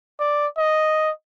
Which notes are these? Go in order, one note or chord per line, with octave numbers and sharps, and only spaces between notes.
D5
D#5